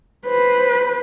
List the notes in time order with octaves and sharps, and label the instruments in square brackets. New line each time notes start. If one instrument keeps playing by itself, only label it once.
[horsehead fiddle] B4 C5